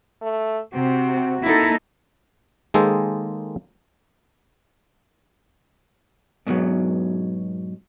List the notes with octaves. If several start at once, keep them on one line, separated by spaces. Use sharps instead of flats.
A3
C3 C4 F#4
A#3 D#4 E4 A4
D#3 G#3 A#3 G#4 A4 C5
G#2 B2 D#3 F#3